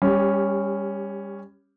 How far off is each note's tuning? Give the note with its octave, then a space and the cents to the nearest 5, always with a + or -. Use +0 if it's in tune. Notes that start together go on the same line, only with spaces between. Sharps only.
G3 +30 C#4 +0 G4 +0